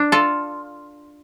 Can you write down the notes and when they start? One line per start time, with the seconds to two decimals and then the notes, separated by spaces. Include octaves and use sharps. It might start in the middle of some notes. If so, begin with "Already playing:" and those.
Already playing: D4
0.12 F4 A4